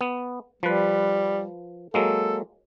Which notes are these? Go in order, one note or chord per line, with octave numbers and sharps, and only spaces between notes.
B3
F3 G3 B4
F#3 G#3 A#3 A4